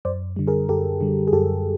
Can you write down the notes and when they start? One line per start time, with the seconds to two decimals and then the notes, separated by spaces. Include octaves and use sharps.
0.05 F#2 C5 D5
0.36 D3 G3
0.47 G#4 A#4
0.69 F#2 G4 A4
1.01 D3 G3
1.28 G#4
1.33 F#2 G4 A4